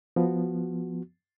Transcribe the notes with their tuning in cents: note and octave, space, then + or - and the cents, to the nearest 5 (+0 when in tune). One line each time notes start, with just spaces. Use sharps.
F3 +0 B3 +0 F#4 +0